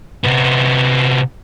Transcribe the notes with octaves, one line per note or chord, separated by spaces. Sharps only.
C3 B3